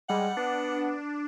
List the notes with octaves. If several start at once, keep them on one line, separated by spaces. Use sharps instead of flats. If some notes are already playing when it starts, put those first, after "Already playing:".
G3 G#3 F#5
B3 D4